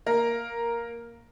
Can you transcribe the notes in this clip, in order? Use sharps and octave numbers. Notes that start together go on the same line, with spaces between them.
A#3 A#4